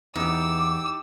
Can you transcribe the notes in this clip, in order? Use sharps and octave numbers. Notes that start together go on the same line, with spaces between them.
E2 D#4 G4 D6 E6